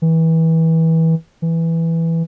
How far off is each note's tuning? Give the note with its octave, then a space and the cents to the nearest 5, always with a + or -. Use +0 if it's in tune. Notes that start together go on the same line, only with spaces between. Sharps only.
E3 -25
E3 +0